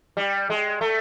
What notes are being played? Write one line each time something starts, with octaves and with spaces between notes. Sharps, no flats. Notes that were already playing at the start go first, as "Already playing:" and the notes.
G3
G#3
A3